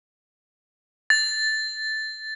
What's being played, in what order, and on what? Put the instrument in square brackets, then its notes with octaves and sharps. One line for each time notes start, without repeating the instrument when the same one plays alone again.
[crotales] A6